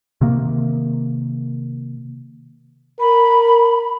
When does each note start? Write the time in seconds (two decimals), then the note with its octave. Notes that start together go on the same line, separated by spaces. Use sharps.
0.21 C3 D#3 A#3
2.99 A#4 B5